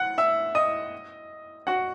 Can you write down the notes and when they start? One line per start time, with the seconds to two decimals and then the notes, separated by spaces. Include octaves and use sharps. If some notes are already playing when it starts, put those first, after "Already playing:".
Already playing: F#5 F#6
0.18 E5 E6
0.55 D#5 D#6
1.67 F#4 F#5